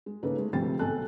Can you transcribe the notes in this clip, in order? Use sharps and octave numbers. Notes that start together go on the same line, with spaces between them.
G#3
C#3 A#3 C#4 D#4 A4 B4
G#3 A3
D2 C3 F3 C4 G5 A6
B1 A4 G#5 A5 F#6